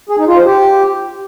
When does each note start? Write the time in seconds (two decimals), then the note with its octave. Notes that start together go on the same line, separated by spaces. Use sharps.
0.09 G#4
0.18 D#4
0.28 F4
0.37 C5
0.46 G4